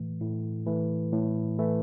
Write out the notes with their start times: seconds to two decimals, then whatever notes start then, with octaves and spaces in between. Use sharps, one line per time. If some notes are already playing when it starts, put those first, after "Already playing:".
Already playing: A2 E3 A3
0.21 A2
0.66 E3 A3
1.12 A2
1.59 E3 A3